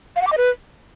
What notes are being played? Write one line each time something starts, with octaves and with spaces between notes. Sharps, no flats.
F5
F#5
D6
D#5
B4